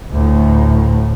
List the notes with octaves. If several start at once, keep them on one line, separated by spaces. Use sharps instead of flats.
D2 A2